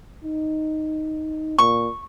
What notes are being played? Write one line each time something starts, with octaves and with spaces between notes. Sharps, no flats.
D#4
A#2 C#6